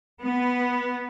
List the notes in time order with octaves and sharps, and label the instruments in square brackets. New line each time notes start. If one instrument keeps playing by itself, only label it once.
[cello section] B3